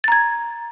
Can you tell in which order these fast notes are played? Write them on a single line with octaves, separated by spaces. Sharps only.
A6 A#5 G#6